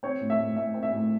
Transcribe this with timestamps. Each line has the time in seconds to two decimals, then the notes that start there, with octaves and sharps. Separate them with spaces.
0.03 C4 C#5
0.21 A2
0.30 E5
0.38 A2
0.56 A2 E5
0.74 C4
0.83 E5
0.92 A2